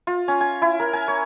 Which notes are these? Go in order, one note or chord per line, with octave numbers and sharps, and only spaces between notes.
F4
C#4
G#5
E4
A#4
G#5
C#5